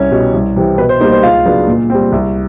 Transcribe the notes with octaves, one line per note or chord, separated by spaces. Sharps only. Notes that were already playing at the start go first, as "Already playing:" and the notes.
Already playing: C2 C#4 C#5
B2 G3
C2
C3 E3
B2 B4
C5
G3 A#3 D#4 C5
C5
C#2 F4 F5
C#3 F#3 B3 D4
A#2
G3 C4
C2